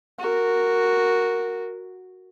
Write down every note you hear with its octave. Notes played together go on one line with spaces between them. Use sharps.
F#4 A#4